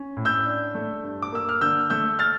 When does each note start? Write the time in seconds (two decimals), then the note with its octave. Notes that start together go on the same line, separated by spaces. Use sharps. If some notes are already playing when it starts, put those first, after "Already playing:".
Already playing: C#4
0.17 A2
0.25 E6 G6
0.46 D4
0.75 A3
1.03 G2
1.22 D6
1.32 A#3 E6
1.49 F6
1.61 D3 E6 G6
1.90 A3 E6 G6
2.19 F6 A6